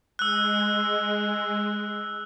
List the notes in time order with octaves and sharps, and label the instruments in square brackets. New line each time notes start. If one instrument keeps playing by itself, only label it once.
[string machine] G#3 [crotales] E6 F#6